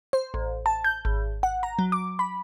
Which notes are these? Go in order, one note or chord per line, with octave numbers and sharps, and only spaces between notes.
C5
A1
A5
G6
G#1
F#5
A#5
F#3
D6
B5